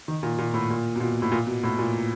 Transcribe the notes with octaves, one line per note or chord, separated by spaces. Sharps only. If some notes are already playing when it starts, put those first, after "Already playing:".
D#3
A#2
A#2
A2
A#2
B2
A#2
A2
A#2
B2
A2
A#2